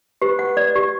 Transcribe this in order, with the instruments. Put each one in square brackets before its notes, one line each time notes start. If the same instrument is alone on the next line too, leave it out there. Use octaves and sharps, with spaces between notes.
[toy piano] G4 [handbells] B4
[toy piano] F#5
D5
G4